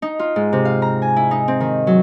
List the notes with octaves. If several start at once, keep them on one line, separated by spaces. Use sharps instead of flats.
D#4
F4
G#2
C3
F5
A#5
G#5
E4
D#4
C4
D#3
F#3